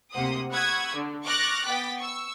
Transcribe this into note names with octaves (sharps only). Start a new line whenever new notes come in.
D2 C3 A#3 C5 F#5 D#6
F#5 B5 C#6 D#6 E6 G#6
D3
C#6 D6 F6 F#6 A6 A#6
B3 G5 D6 A6 B6
C#6 E6